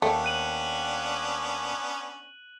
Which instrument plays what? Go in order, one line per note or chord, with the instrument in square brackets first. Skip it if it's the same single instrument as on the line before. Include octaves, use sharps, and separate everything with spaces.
[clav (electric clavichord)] D#2 [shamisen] A3 [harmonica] B3 C#4 D4
[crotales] F#6 D#7 F#7